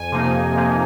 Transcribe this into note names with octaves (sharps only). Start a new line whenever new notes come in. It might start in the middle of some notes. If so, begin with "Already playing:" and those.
Already playing: F2 G#5
C3 F3 A#3 D#4
F2
C3 F3 A#3 D#4